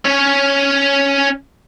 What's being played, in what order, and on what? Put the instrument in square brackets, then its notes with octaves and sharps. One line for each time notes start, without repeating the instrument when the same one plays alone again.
[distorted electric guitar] C#4 C#5